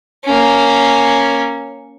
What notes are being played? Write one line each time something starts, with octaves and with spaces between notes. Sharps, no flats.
A#3 C#4